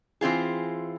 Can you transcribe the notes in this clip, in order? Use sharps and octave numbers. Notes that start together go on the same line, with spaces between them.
E3 C4 F4 G#4